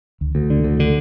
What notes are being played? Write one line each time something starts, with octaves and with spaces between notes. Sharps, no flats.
D2
D2
D3
D2
D3